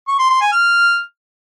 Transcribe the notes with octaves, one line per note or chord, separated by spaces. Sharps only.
C#6
C6
C6
G#5
F6